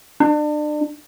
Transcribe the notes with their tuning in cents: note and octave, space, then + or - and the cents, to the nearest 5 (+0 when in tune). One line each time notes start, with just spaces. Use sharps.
D4 +35